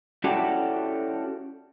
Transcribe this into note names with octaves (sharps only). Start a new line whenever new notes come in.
C#4 E4 F#4 G4 A4 D5